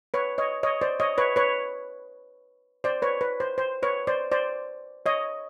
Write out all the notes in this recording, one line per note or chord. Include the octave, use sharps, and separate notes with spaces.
B4 C#5
C#5 D#5
C#5 D#5
C5 D5
C#5 D#5
B4 C#5
B4 C#5
C5 D5
B4 C#5
B4
C5
C5
B4 C#5
C5 D5
C5 D5
C#5 D#5